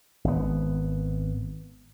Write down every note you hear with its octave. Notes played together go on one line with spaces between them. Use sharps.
G#1 B3